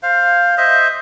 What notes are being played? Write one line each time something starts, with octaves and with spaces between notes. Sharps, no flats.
C5 F5
C5 D#5 E5